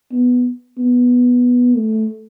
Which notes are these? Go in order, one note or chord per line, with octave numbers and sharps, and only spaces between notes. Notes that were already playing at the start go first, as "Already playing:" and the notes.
B3
B3
A3